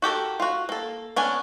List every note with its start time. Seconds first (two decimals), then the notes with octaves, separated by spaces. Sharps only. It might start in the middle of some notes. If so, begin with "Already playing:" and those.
0.02 F#4 G4 A4 A#4
0.40 F4 F#4
0.69 A#3 A4
1.16 B3 C#4 D4 G#5